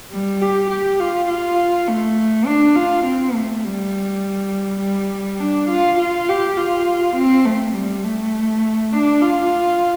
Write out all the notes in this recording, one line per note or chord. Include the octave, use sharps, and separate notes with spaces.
G3
G4
G4
F4
F4
A3
D4
F4
C4
A3
G3
G3
D4
F4
F4
G4
F4
C4
A3
G3
A3
D4
F4